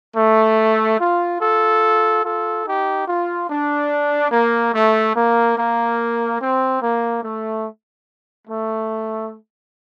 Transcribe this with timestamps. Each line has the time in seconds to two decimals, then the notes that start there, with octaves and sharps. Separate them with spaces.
0.15 A3
0.98 F4
1.39 F4 A4
2.22 F4 A4
2.64 D#4 G4
3.06 F4
3.48 D4
4.31 A#3
4.73 A3
5.14 A#3
5.55 A#3
6.38 C4
6.80 A#3
7.22 A3
8.47 A3